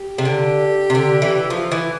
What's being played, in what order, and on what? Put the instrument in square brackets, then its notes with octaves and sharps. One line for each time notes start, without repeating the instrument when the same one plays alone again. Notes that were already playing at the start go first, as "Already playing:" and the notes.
Already playing: [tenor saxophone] G4
[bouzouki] C3
D3
C3
D3
E3
[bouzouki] F3 [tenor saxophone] F4
[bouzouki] E3 [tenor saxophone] E4